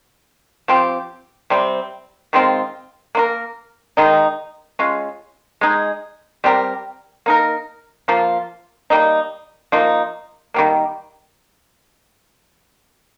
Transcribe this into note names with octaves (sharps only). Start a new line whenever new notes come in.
F3 C4 G4
C3 G3 C4
D#3 G#3 C4 F4
A#3 F4 A#4
D#3 G#3 D#4
G#3 C#4 F4
G#3 D#4 G#4
G3 C4 G4 A#4
A#3 D#4 A#4
F3 A#3 F4
G3 A#3 D#4
F3 A#3 D#4
D#3 G3 A#3